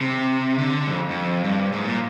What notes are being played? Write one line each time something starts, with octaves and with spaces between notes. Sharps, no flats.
C3
D3
F2
F2
G2
G#2
A#2